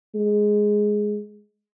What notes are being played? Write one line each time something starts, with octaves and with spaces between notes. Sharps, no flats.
G#3